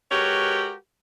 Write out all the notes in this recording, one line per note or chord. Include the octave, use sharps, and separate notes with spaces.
G#3 F#4 G4 A#4 B4 C#5